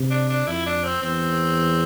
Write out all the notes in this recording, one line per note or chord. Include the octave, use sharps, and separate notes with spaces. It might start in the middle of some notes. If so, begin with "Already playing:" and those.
Already playing: C3
D4
D4
F2 E4
D4
C4
E2 C4